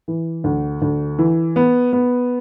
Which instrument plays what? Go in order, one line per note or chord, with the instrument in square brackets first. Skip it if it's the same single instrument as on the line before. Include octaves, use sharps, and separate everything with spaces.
[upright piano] E3
D2
D2
E3
B3
B3